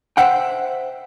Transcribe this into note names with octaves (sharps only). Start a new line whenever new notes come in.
C5 E5 F#5 G5